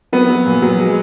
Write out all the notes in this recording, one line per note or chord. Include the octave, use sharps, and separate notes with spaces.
F#3 B3
F#3
A#2
F#3
G#3